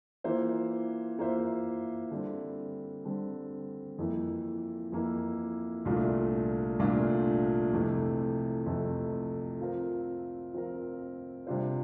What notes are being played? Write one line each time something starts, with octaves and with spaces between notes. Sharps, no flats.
E3 A#3 F4 C5 E5
E3 A#3 F4 C5 E5
D3 G3 C4
D3 G3 C4
F2 E3 A#3 E4
F2 E3 A#3 E4
C2 A#2 A3 D4 F4
C2 A#2 A3 D4 F4
F2 C3 E3 A3
F2 C3 E3 A3
F3 C4 F4 A#4
F3 C4 F4 A#4
C3 G3 D4 F4 C5